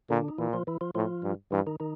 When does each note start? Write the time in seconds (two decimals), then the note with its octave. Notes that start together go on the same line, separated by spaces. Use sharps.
0.10 A#2 D3 D4
0.28 D#4
0.38 A#2 E3 E4
0.53 F3 F4
0.67 E3 E4
0.81 F3 F4
0.95 A2 F3 F4
1.23 G2
1.51 G2 E3 E4
1.67 D#3 D#4
1.80 D#3 D#4